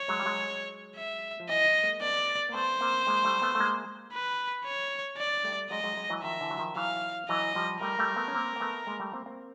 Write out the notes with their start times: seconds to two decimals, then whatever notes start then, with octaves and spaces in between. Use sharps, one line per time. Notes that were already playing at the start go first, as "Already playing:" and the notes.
Already playing: C#5
0.08 F#3 G#3
0.20 G3
0.26 F#3 G#3
0.96 E5
1.40 F3
1.49 E3 F#3 D#5
1.83 G#3 A#3
2.01 A3 B3 D5
2.49 A#3
2.54 A3 B3 C5
2.81 A#3 C4
3.07 G#3 A#3
3.25 G3 A3
3.42 A3 B3
3.55 A3
3.60 G#3 A#3
4.13 B4
4.65 C#5
5.18 D5
5.44 G3 A3
5.70 F#3 G#3 D#5
5.84 F#3 G#3
5.97 F#3 G#3
6.10 E3 F#3
6.23 D#3 F3 E5
6.41 D3 E3
6.51 F#3
6.58 D#3 F3
6.76 E3 F#3 F5
7.29 E3 F#3 D#5
7.55 F3 G3
7.81 G3 A3 A#4
7.99 G3 A3
8.16 A3 B3
8.28 C#4
8.35 A#3 C4
8.56 A#3
8.60 A3 B3
8.87 G#3 A#3
9.00 G3 A3
9.13 A#3 C4
9.26 A#3 C4